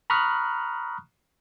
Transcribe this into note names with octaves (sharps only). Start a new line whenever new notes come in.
A#5 B5 C#6 D#6 F6 F#6